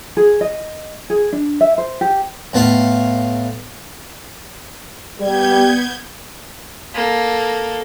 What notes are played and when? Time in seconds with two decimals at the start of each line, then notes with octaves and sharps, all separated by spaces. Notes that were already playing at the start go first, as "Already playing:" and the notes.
0.17 G#4
0.41 D#5
1.10 G#4
1.33 D4
1.61 E5
1.78 C5
2.01 G4
2.53 A2 B3 F4 F5
5.19 G3 B3 G6 G#6
6.94 A#3 A4